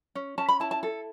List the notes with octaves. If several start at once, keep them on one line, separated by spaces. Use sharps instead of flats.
C#4
C#4 A5
B5
E4 A5
A5
A4